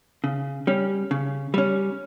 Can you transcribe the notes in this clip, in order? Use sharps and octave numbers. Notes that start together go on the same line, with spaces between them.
C#3
G3 C#4
C#3
G3 C#4